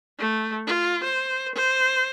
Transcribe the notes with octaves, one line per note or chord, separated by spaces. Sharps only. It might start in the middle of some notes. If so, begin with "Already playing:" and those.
A3
F4
C5
C5